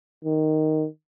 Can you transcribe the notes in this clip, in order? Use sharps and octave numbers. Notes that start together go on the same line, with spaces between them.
D#3